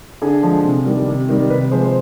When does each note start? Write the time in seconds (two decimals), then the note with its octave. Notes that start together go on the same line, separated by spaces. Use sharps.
0.22 D3 G#4
0.43 F3 G#3
0.64 C3
0.86 D#3 G3
1.08 C3
1.29 D#3 G3
1.50 C3 B4
1.71 F3 G#3 C5
1.83 C5